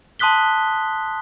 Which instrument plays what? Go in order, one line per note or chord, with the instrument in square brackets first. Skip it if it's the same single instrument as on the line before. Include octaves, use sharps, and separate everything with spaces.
[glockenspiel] A5 C6 D#6 F#6 B6 G7